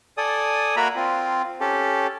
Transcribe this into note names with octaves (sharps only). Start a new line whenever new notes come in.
A4 D5 G#5 D#6
A#3 F#4 A#4 E5 A#5 B5
C4 F4
C#4 G4 A4